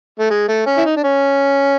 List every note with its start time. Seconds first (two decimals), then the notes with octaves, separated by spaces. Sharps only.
0.20 A3
0.31 G#3
0.49 A3
0.66 C#4
0.77 E4
0.85 D#4
0.97 D4
1.04 C#4